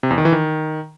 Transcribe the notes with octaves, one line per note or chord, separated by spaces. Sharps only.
C3
E2
D#3
E3
D#3